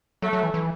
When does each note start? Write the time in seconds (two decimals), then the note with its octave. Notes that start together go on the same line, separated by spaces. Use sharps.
0.22 F#3 A3
0.33 F#3
0.43 E3
0.54 E3